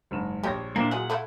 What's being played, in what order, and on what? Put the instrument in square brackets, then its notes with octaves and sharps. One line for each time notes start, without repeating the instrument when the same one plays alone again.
[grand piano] F#1 G#2 E7
[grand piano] A#1 C#5 A#6 [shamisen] G3 G4
[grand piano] A#2 E4 [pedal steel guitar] A#3 D4 [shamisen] C4
[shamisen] F#3 G#3 [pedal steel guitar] F#5
[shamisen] A3 E4 F4